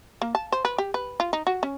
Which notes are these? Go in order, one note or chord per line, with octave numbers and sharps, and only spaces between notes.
A#3
A5
C5
B4
G4
B4
F4
D#4
F#4
C#4